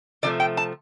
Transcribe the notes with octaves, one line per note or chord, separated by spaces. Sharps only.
C3 F3 A3 D5
G5
A5